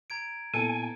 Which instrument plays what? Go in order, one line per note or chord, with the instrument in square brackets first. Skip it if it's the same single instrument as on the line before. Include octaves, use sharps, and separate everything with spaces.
[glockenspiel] A#5 G#6 D7
[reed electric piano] A#2 B3 E4 [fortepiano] A4 [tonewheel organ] G#5